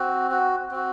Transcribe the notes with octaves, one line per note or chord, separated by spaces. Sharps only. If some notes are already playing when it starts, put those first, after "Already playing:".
Already playing: C4 F#4
F#4
C4 F#4